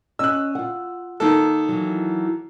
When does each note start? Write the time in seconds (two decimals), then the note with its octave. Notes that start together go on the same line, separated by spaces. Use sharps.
0.19 C#4 D#5 E6 F#6
0.55 F4 F#5
1.20 D#3 A#3 A4
1.69 E3 F#3